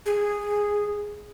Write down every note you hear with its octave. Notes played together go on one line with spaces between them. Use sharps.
G#4